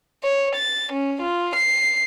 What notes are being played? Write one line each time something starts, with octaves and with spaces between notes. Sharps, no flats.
C#5
A6
C#4
F4
C7